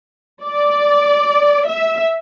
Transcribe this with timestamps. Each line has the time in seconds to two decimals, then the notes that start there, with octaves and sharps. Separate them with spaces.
0.43 D5
1.67 E5